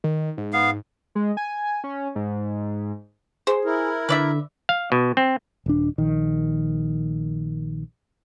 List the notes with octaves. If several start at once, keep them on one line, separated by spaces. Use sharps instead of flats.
D#3
G#2
B3 F5
G#3
G#5
C#4
G#2
G#4 C5
E4 A#4
D3 B4 D5 E5
F5
B2
C4
D#1 D4
A#1 D#3